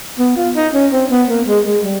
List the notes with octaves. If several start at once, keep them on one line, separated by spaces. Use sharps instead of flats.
B3
F4
D#4
C#4
C4
B3
A#3
G#3
G#3
G3